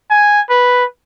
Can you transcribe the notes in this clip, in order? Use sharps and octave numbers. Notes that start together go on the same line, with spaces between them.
G#5
B4